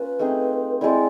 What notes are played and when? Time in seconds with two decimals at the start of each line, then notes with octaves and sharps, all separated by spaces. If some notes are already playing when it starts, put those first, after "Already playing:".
Already playing: A#3 C#4 F4 B4
0.19 A3 C4 D#4 G#4
0.81 G#3 C4 E4 D5